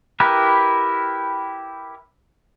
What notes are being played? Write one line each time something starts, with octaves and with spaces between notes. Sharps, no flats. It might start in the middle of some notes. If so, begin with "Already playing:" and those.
E4 G4 A#4 B4